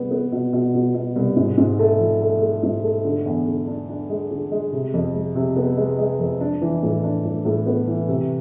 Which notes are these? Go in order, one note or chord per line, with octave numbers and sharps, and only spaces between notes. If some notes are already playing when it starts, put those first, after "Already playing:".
Already playing: C2 B3
B3
B2
B2
B2
B2
C2
G#2
G#2
A3
F3
A3
A3
G#2
A3
D3
E2
D3
D4
D4
G#3
D3
G#3
C3
F2
G#3
C3
B3
G#3
G#3
F2
D4
E3
A2
D4
A2
A2
B3
E3
C3